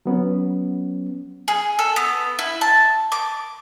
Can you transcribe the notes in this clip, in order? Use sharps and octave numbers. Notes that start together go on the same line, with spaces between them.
F#3 B3 C#4
G#4
A4
B3
E4
A5
D6